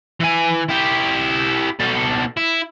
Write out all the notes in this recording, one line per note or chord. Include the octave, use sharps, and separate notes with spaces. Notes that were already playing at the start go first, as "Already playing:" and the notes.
E3 G#5
E4 G4
B2 A4
E4